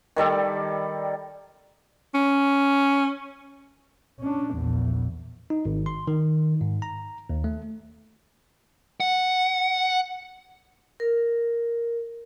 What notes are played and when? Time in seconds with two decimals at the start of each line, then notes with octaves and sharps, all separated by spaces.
0.16 D#3 G3 A4 D5
2.15 C#4
4.20 C#4 D4
4.54 A#1 E2
5.50 D#4
5.65 G#1
5.86 C6
6.07 D#3
6.61 G#2
6.82 A#5
7.30 D#2
7.44 A3
9.00 F#5
11.00 A#4